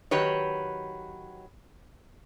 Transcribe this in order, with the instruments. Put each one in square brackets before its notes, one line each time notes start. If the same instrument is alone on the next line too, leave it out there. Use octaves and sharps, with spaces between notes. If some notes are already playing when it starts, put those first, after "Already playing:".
[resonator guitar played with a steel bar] D#3 F#3 G4 B4 C#5